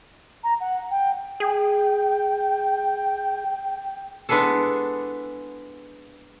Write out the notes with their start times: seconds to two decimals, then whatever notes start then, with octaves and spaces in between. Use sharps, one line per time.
0.44 A#5
0.61 F#5
0.91 G5
1.40 G#4 G5
4.29 G#3 B3 D4 E4 G#4 A4